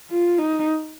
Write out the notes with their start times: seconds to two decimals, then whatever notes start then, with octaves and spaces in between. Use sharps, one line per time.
0.10 F4
0.39 D#4